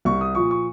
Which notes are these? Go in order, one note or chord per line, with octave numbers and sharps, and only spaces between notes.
C2 C#6
D#6
A#2 F3 C#6
C#6